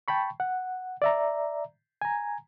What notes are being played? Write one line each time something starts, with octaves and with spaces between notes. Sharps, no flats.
G5 A5 B5 C#6
F#5
D5 E5 A#5
G#5 A#5